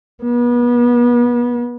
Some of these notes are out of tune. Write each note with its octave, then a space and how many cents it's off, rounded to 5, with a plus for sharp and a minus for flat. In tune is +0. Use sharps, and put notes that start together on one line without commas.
B3 -35